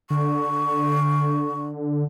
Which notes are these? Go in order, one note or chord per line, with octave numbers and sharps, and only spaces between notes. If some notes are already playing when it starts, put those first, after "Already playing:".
D3 C#6